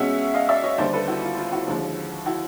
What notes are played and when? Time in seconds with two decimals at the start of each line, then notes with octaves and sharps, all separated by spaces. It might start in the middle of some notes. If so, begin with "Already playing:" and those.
Already playing: B2 G#3 C#4 E5 F#5
0.34 D#5 F5
0.49 D5 E5
0.64 C#5 D#5
0.78 D#2 D3 G3 C5 D5
0.93 A4 B4
1.08 E4 F#4
1.23 F4
1.38 F4
1.52 E4 F#4
1.67 D#2 D3 F3 G#3
2.26 E4 F#4